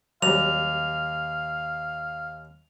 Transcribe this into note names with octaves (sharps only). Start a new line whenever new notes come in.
D#2 F#3 G3 F5 F7